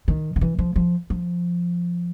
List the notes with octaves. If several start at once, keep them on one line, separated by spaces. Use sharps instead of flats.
D#3
D#3
E3
F3
F3
F3